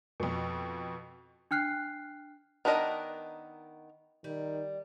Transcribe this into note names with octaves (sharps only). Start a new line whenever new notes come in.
F2 B2
D4 G5 F6 F#6 C7
D#3 B3 D4 A#4 D#5
D#3 G3